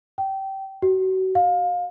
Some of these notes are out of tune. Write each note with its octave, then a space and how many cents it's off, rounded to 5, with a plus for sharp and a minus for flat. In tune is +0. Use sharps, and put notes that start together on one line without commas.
G5 -20
F#4 +30
F5 +25